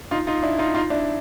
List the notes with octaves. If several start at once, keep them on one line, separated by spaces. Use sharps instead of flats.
D#4 F4
D#4 F4
D4 E4
D#4 F4
D#4 F4
D4 E4